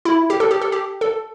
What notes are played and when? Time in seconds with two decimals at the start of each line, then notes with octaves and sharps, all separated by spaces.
0.05 E4
0.30 G4
0.40 A4
0.51 G4
0.61 A4
0.72 G4
1.01 A4